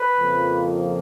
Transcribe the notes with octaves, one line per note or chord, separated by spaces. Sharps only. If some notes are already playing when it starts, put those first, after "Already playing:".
Already playing: B4
F2 C#3 F3 A#3